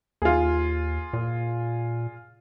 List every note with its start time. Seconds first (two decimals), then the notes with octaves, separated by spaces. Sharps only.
0.22 D#2 F4 G#4
1.13 A#2